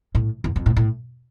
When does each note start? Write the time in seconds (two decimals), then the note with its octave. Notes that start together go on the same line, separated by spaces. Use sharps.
0.15 A2
0.44 E2
0.56 F2
0.66 A2
0.77 A2